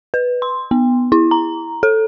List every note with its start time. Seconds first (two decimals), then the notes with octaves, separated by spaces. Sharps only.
0.14 B4
0.42 C6
0.71 B3
1.12 E4
1.31 A#5
1.83 A4